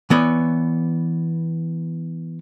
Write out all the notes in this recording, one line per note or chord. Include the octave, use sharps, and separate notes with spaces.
E3 B3 C#5 D5